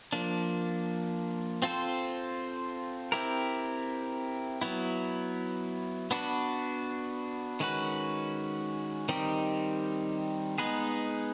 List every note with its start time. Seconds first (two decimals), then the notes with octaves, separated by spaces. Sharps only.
0.13 F3 A#3 D4
1.62 C4 F4 A4 C5
3.12 C4 E4 G4 A#4
4.61 F#3 B3 E4
6.11 B3 D4 F#4 B4
7.60 D#3 G#3 C#4 F#4 B4
9.09 D#3 G3 C4 D#4 G4
10.58 G#3 B3 D#4 G#4 B4